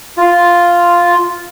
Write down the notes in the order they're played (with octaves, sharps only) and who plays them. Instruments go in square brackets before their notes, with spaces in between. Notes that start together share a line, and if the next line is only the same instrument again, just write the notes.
[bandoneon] F4